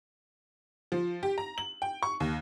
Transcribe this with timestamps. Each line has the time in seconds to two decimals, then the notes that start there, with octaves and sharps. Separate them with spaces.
0.92 F3
1.23 G4
1.38 A#5
1.58 F#7
1.82 G5
2.03 C#6
2.20 D#2